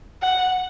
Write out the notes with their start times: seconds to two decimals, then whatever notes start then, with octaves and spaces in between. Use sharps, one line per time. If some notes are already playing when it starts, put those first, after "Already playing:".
0.22 F#5